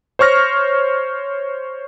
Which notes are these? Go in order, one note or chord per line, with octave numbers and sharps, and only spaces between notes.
C5 C#5 C#6 F6 A#6